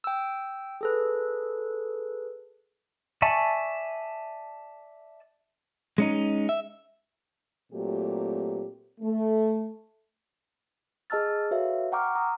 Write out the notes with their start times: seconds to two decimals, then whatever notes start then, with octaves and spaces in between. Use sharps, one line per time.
0.04 G5 E6
0.81 G#4 A4 B4
3.22 D5 E5 G#5 A5 C#6
5.98 G#3 C#4 D#4
6.49 E5
7.72 A#2 F#3 A3 C4 G4
9.01 A3
11.10 G#4 D#5 A5 E6 F6 A6
11.51 F#4 A4 B4 C#5 E5 F5
11.92 F#5 G5 A#5 C#6 D6 F6
12.15 A#5 D#6